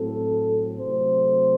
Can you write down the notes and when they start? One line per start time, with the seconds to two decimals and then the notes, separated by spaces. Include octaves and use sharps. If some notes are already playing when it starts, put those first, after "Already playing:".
Already playing: A2 F#3 C4 A4
0.79 C3 F#3 A3 C5